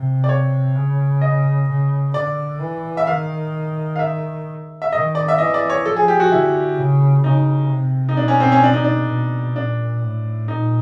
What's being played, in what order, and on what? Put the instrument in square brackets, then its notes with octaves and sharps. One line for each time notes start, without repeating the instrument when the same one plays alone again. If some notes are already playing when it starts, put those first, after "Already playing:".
Already playing: [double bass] C3
[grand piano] D5
C#5
[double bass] C#3
[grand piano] D#5
[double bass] C#3
[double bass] D3 [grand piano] D5
[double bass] E3
[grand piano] E5
[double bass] D#3 [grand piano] F5
[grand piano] F5
E5
E5
[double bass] D#3 [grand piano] D#5
[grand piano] D5
E5
[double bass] E3 [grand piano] D#5
[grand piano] D5
C#5
[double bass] F3 [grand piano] A4
[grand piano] G#4
G4
F#4
[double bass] D3 [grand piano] E4
[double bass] C#3
[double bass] C#3 [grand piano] D#4
[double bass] C3
[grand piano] D#4
[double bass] B2 [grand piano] D4
[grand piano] C#4
C4
C#4
D4
D#4
D4
[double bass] B2
[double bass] A#2 [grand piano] D4
[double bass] A2
[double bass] A#2 [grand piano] D#4